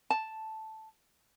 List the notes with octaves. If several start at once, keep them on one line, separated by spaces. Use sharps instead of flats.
A5